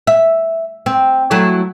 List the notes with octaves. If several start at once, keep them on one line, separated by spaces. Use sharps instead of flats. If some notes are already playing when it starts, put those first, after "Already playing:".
E5
C4
F#3 A3 E4